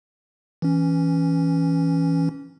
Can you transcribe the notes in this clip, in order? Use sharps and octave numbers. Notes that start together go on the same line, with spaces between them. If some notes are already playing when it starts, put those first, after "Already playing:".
E3 C#4